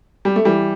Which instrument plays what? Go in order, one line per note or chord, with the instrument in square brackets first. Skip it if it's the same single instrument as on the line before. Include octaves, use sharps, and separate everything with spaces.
[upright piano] G3
A3
E3 G3